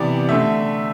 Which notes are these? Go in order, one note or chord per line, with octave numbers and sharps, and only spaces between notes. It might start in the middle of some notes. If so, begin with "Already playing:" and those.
Already playing: C3 E3 B3 D5
D3 A3 E5